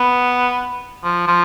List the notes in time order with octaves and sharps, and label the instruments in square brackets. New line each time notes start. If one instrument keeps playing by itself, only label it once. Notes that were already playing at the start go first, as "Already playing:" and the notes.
Already playing: [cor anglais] B3
F3
F3